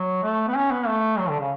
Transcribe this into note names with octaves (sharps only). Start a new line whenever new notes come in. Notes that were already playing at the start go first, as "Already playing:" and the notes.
Already playing: F#3
A3
B3
C#4
B3
A3
F#3
D3
C#3